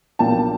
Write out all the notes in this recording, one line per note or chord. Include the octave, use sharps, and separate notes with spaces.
B1 A#2 F3 A#3 D4 G5 A5